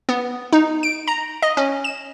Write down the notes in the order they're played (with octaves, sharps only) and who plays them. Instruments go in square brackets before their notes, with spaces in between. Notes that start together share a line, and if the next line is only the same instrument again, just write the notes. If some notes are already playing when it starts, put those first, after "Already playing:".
[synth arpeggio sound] B3
D#4
D7
A#5
D#5
C#4
E7